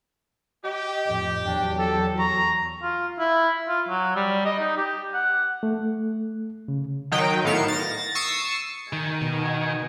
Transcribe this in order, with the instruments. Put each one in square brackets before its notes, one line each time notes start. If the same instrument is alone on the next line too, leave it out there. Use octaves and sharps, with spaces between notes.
[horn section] G4 [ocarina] D#5
[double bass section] F2 A2 [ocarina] D#5
[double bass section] E2 F#3 [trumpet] D4 [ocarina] G5
[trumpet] A4
[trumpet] A#5 [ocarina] C#6
[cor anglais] F4
E4
F4
F#3
G3
D#5
D#4
G4
F#5
[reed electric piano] A3
C#3
[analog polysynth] D#3 F#3 D#4 G5
A2 D#3 B3 F5 C#7 E7
A6 A#6
C#6 D#6 E6 A6 C7 C#7
[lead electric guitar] D#3 [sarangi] G#5
[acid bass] B2